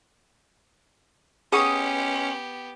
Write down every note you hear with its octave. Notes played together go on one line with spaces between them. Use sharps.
B3 C#4 G4 G#4 F#5 C#6 D#6